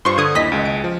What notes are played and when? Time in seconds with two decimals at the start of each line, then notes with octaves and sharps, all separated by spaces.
0.05 G2 F4 C5 C6 C#6
0.18 D3 D#6 G#6
0.35 D#2 E4 D#5 B6
0.52 C#2 G#3
0.65 D7
0.84 F3